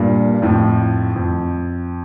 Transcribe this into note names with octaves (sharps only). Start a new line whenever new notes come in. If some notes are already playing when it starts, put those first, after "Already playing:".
Already playing: G2 A#2
F2 A2
F2